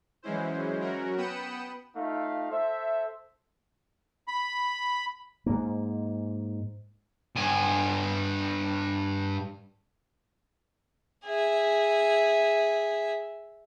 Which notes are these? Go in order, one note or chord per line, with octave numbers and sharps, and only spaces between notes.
E3 F#3 G#3 C#4 E4 C5
F#3 C#4 F#4 A#4
B3 G5 B5 D#6 C#7 E7
A3 D#4 F4 F5
A4 C5 E5
B5
G#2 A#3
G2 G#5
G#4 E5